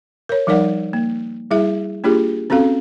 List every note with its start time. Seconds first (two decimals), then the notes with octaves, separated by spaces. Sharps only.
0.29 A#4 C#5
0.47 F3 G3 D#4 A#4 D5 F#5
0.93 A#3
1.51 G3 E4 G#4 E5
2.04 A#3 D4 F4 G4 G#4
2.50 C4 C#4 F#4 A4 F5